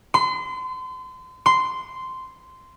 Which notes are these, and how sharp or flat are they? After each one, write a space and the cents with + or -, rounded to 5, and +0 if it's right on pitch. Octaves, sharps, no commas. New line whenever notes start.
C6 -35
C6 -10